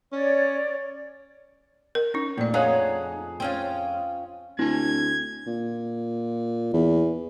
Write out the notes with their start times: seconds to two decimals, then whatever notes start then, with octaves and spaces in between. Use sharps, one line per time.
0.12 C#4 C#5 D5
1.95 A#4
2.14 C#4 D#4
2.38 F2 A#2 A3 D5
2.54 F2 D#4 G#4 C#5 F5 F#5
3.40 C4 C#4 F4
4.59 D2 C4 E4 G#5 G#6
5.47 A#2
6.74 E2